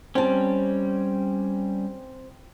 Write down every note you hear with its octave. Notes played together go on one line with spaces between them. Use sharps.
G3 C4 C#4 A5